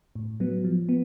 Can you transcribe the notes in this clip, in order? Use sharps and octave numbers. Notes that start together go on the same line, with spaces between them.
A2
F#3 B3
F3
B3